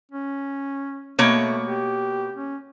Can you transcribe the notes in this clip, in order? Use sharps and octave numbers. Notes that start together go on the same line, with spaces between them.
C#4
B2 A3 A#3 C#5
G4
C#4